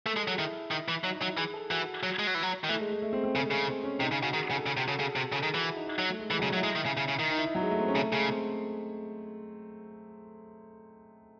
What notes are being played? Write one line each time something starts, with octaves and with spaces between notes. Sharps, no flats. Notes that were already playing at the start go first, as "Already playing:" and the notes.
A3 A4
G#3 A4
F#3 G#4
D#3 E4
D#3
E3
F#3 D#4
D#4
F#3
E4
E3 G#4
A4
E3 F#4
F#3
G#3
F#3
E3
F#3
D#3
E3 A3
G#3
G#3
A3
C4
C4
C#3 A3
G#3
C#3
C4
C#4
C3 D#4
C#3
C#3 F#4
D#3 G#4
G#4
C#3
A4
C#3 G#4
C3 F#4
C#3 A4
C#3 G#4
C3 F#4
C#3 A4
D#3 G#4
E3 F#4
E4
D#4
D#4
F#3
A3
G#3
E3 G#3
F#3
C#3
G#3
F#3
E4
G#3
D#3
C#3
C#3
C#3
D#3
D#4
E4
D#4
F#3
G#3
A3
C4
C#4
C#3 A3
C#3 G#3
C4